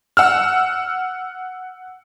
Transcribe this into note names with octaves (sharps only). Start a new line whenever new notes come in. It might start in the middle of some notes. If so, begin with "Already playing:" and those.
F#5 E6 F6